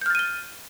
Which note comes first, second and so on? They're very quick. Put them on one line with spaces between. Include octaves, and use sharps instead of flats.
G6 F6 A6 D#7 G7